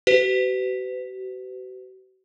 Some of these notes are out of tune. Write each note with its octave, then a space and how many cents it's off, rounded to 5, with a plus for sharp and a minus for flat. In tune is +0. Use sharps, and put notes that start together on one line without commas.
F#4 +45 B4 +40